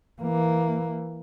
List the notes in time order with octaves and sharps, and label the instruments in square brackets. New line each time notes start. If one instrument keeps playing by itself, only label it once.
[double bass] E3 A#3